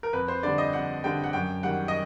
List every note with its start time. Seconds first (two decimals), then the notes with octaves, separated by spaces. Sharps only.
0.03 A#4
0.13 F2 B4
0.28 C5
0.43 D3 G3 D5
0.58 D#5
0.73 F2 F#5
1.04 D3 G3 G5
1.24 F#5
1.33 F#2 G5
1.63 D#3 G3 F#5
1.88 D#5